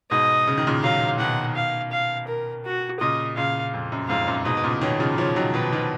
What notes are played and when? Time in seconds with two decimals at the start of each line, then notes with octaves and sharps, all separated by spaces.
0.11 G#2 B2 D#5
0.47 C#3
0.58 D#3
0.67 A#2 C#3
0.83 D#3 F#3 F5
1.19 B2 D#3 F#5
1.56 F5
1.92 F5
2.28 A#4
2.65 F#4
3.00 A#2 C#3 D#5
3.37 A#2 C#3 F5
3.74 F2
3.92 F#2
4.09 F2 G#2 F5
4.27 F#2 A#2
4.45 G#2 B2 D#5
4.57 B2
4.64 A#2 C#3
4.81 B2 D#3 C#5
5.00 C#3 F3
5.18 C#3 F3 C#5
5.36 D#3 F#3
5.54 B2 D#3 B4
5.72 B2 D#3